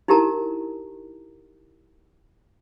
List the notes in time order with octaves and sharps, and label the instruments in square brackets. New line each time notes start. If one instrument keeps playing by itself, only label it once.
[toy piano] D#4 E4 G4 A#4 A5 A#5